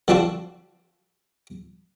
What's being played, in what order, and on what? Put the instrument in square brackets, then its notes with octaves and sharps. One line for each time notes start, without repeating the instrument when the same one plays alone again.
[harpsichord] D3 F3 C4 D4 F#4 A4